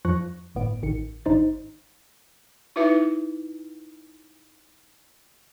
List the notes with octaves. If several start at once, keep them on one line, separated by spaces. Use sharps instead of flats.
F2 F3 C#6 F#6 A#6
G1 A2 B3 D7
A1 D#3 C#7
G#1 D4 D#4 C5 A6
D#4 E4 F#4 B4 E5 D6